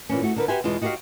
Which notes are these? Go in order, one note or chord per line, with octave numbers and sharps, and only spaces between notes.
A#2 E3 C#4
A3 F#4
D3 A#4 B4
F#4 G4 B4 C5 E5 G#5
E2 B2 G#3 F4
D#4 F#4 G4 B4 C#5 F5